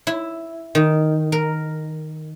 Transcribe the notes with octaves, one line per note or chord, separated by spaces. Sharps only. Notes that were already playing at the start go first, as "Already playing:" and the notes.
E4
D#3
A#4